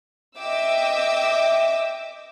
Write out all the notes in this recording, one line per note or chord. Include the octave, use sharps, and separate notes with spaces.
D#5 E5 G5 D6 E6